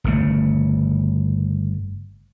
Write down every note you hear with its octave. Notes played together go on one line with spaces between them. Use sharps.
G1 C#3 A3